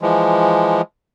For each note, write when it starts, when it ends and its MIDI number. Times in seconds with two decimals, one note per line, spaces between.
0.02 0.81 52
0.02 0.81 53
0.02 0.81 56